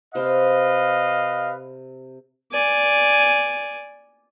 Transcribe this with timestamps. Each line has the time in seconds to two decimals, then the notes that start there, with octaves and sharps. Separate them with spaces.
0.15 C3 B4 C5 D#5 F5 C6
2.52 D5 G#5